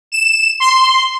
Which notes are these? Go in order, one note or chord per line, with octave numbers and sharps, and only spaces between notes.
E7
C6